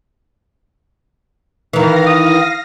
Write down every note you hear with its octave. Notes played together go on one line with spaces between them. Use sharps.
D#3 E3 F5 A#6
D#6